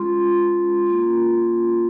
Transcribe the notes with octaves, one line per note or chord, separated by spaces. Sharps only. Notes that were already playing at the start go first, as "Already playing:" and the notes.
Already playing: G#3 C#4 F4 C6
A#3 C#4 F4